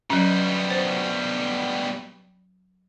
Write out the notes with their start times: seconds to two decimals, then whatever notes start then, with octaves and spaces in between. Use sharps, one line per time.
0.10 B2 F#3 G3 C#4
0.70 C5